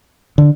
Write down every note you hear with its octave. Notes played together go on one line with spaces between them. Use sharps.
D3